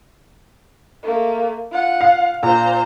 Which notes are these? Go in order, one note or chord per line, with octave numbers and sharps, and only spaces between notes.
A3 A#3
F4 F#5
F5
A#2 C5 A#5